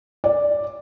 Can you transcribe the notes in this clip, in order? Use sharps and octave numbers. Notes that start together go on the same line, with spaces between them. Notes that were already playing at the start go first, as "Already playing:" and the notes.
D5